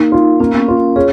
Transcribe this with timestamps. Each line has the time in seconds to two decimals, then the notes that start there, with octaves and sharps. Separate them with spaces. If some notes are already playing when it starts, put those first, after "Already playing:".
Already playing: A#3 D#4
0.12 F4
0.40 A#3 C#4
0.52 B3
0.59 C#4
0.68 F4
0.77 C#4
0.96 C#4 G#4